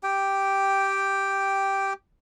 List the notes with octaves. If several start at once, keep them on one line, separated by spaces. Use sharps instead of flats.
G4 G5